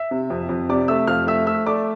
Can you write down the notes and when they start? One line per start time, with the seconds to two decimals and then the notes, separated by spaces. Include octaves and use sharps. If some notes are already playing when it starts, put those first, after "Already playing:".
Already playing: E5 E6
0.11 C3
0.30 F2
0.49 F2
0.69 C3 D5 D6
0.88 A3 E5 E6
1.07 F2 F5 F6
1.27 A3 E5 E6
1.46 A3 E5 E6
1.66 A3 D5 D6